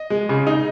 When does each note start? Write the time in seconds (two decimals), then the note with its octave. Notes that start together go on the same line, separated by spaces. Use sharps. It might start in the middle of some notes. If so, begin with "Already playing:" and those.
Already playing: D#5
0.10 G#3
0.29 C#3
0.47 D#4